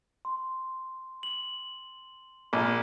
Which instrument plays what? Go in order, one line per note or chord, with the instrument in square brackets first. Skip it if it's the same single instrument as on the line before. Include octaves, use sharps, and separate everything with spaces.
[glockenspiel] C6
F#7
[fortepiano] A#1